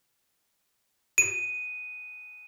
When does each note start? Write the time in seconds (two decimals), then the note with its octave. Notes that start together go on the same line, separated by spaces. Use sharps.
1.18 D#7